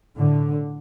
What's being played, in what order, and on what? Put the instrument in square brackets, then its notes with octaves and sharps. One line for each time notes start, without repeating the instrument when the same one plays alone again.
[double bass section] A2 D3